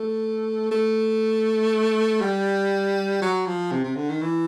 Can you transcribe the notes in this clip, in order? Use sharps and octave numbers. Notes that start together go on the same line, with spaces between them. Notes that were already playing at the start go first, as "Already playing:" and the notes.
Already playing: A3
A3
G3
F#3
F3
C3
C3
D3
D#3
E3